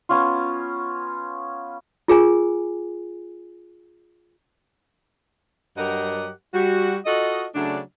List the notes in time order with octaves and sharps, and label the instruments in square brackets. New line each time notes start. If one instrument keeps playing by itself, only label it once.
[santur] B3 C#4 F4
[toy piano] F4 G#4 A#4 G#5
[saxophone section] G2 F#3 G4 A#4 D#5 F#5
G3 F#4
F4 F#4 A4 D#5
C#3 F#3 A3 D4